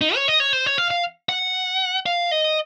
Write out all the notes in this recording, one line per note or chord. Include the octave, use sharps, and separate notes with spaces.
D#4
C#5
D#5
C#5
C5
C#5
F5
F5
F#5
F5
D#5